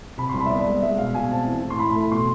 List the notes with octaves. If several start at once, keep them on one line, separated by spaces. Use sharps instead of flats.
C3 B5
C6
C2
B5
E5
B3 D5
G#3
G#3 E5
B2 F5
B2 G#5
C4 A5
E3
A2
C6
A2 B5
A3
B2 C6